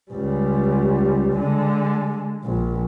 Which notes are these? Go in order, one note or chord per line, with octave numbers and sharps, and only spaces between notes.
C#2 G3
D3 G#3
A#1